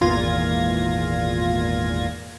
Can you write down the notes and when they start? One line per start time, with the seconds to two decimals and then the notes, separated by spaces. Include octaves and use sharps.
0.01 G#1 E2 A#2 F4 G#6 A#6